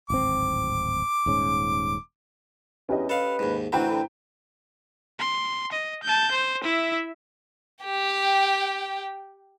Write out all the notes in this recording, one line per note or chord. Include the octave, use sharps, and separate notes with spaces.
D1 G#1 C4 D6
D#1 G#2 C#4
E2 C#4 G4 D#5
A4 B4 F5
D#2 G#2
A1 E3 C4 F#4 G5 A#5 B5
D3
C6
D#5
A5 G6
C5
E4 E5
G4 G5